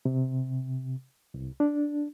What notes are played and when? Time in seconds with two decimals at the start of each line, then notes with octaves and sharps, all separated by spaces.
0.05 C3
1.34 C2
1.60 D4